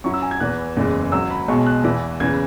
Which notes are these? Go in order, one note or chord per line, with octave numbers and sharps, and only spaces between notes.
F#2 F#3 E4 C#6
E6
G#5
G#6
E2 E3 B3 F#6
F#1 E2 C#3 E3 G#3
G#1 F#2 F#3 E6
B5
B1 B2 G#3 C#6
F#6
E2 E3 B3 E4
E2 C#3 E3 G#6